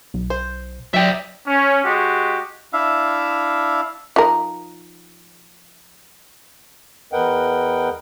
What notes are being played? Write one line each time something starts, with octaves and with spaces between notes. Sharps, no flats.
B1
C5
F#3 D#4 G4 D5 E5
C#4
G#3 F#4 G4
D4 E4 E5 F5
F3 D#4 A#4
E2 A#4 B4 D#5 F#5 G5